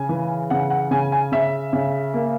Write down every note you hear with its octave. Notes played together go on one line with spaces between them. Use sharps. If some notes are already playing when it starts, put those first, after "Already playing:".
Already playing: C#3 G#5
E3
C#3 F#5
F#5
C#3 G#5
G#5
C#3 E5
C#3
A#3